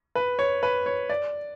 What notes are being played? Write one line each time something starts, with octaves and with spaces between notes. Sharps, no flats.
B4
C#5
B4
C#5
D5